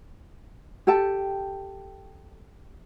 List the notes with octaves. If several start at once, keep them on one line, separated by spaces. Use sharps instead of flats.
G4 A4 G5 A5